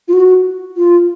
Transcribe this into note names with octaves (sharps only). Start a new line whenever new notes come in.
F4
F#4
F4